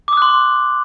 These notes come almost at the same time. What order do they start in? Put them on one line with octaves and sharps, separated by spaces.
D6 D#6 F#6 C6